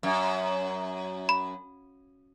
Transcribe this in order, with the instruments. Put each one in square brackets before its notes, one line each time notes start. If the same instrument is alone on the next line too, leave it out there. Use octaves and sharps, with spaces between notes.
[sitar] F#2
[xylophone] B5